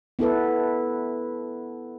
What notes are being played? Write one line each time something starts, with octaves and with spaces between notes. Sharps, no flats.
B3 E4 A4 B4